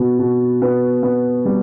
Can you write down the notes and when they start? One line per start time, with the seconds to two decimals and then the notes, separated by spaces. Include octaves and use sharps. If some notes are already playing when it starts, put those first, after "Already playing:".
Already playing: B2 B3
0.19 B2
0.62 B3
1.03 B3
1.45 G3